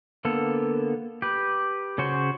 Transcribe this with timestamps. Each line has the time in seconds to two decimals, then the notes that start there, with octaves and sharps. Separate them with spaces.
0.25 D3 A#3 B3 A4
1.22 G4 B4
1.98 C#3 C#4 F#4 C5